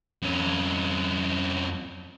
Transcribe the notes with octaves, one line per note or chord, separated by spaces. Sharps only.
F2 C#4